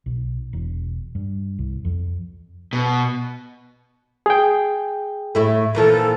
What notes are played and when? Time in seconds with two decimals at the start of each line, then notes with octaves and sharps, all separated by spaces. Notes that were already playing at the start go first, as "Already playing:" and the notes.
0.06 B1
0.53 E1
1.15 G2
1.59 C2
1.85 F2
2.73 B2
4.26 G#4 G5
5.35 A2 E4 A4
5.75 A#2 E3 F3 A4